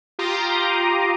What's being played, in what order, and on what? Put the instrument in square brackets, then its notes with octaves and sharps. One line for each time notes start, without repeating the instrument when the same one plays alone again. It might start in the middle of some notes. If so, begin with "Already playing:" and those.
[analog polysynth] F4 G4 A#5 C6 D6 D#6